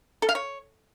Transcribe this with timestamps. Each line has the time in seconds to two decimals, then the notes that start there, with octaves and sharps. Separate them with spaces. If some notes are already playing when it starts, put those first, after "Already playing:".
0.22 A4
0.29 F5
0.35 C#5